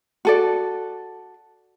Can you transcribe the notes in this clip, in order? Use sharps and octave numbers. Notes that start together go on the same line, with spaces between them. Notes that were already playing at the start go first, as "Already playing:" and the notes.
F#4 A4 D5